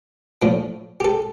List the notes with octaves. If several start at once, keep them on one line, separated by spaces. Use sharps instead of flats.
A2 F3 D4
G4
A4